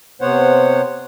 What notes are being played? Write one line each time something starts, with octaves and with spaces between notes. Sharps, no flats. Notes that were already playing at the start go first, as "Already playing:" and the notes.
C3 B3 C5 C#5 F#5